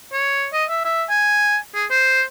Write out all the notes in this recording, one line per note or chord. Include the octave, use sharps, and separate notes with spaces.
C#5
D#5
E5
E5
G#5
G#4
C5